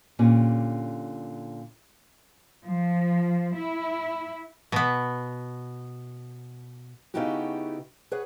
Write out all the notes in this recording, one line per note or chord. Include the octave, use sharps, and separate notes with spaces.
A#2 D3 C#4 G4
F3
E4
B2 B3
C#3 B3 D#4 E4 F#4 G4
G#4 B4 C#5 F#5